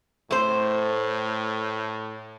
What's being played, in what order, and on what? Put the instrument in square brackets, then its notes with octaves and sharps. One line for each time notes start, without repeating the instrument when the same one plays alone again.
[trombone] A2 [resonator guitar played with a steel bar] A3 C5